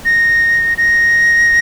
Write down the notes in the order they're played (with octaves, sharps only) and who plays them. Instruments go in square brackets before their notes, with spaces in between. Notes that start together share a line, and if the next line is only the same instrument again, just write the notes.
[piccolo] A#6
A#6